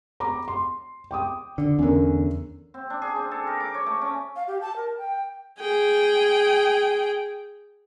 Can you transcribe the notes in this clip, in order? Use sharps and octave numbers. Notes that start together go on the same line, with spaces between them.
A#5 B5 D6
C6
G5 D6 D#6
D3
E2 D3 C#4 A#4
C4
D4
G#4
C4
A4
A#4
D6
C#5
A3
C#4
F5
G4
A5
A#4
G5
G#4 G5